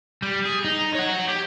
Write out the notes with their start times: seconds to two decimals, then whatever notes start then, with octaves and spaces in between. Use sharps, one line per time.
0.22 G3
0.45 G#4
0.65 D#4
0.95 C#5 F#5
1.28 G4